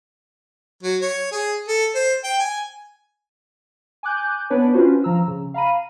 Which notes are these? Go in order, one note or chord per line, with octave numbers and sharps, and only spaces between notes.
F#3
C#5
G#4
A4
C5
G5
G#5
G#5 D6 F#6 G6
B3 D4 B4 C#5
C#4 D4 F4 F#4 B4 C5
F3 A#5 E6
C#3
F5 A#5 B5 D#7